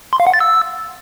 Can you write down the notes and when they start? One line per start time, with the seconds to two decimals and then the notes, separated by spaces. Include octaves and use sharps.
0.13 C6
0.20 F5
0.27 F#5
0.34 A6
0.40 E6